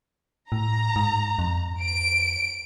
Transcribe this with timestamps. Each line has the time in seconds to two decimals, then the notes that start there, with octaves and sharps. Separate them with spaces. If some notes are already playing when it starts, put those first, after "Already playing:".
0.52 A2 A#5
0.96 G#2
1.39 F2
1.81 D7